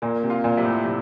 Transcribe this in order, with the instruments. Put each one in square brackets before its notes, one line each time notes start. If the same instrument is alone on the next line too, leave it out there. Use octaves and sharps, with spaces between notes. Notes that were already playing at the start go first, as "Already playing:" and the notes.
[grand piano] A#2 [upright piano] A#3
[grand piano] C3
[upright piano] F4
[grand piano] A#2
[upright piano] C3
[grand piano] A2
[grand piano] A2 [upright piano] C3